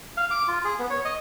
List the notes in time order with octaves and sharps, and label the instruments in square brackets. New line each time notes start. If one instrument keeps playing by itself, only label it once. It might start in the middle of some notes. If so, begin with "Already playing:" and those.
[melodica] F5
D6
F4
G#4
B3
C#5
D#5